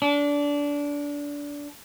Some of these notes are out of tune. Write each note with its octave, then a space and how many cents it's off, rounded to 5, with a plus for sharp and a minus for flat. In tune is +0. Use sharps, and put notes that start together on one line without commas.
D4 -20